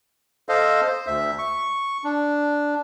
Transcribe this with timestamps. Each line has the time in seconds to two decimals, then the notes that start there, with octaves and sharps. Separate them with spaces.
0.49 A4 C5 D#5 F5
0.87 C5
1.07 D2 E5
1.39 C#6
2.04 D4